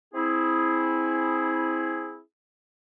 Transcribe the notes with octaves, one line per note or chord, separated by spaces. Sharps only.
C4 E4 G#4